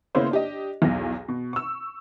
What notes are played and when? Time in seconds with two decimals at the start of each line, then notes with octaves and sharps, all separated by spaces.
0.15 C#3 A#3 B3 E4 C5 C#5
0.31 D4 G4 D#5
0.82 B1 E2 A#6
1.28 B2
1.53 C#6 E6